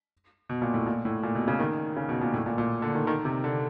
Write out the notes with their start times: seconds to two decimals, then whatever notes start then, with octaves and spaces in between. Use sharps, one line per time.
0.49 B2
0.62 A#2
0.74 A2
0.86 A#2
1.05 A2
1.23 A#2
1.35 B2
1.48 C#3
1.60 D#3
1.96 C#3
2.09 B2
2.21 A#2
2.34 A2
2.46 A#2
2.58 A#2
2.82 D3
2.95 D#3
3.07 D#3
3.25 C3
3.44 D3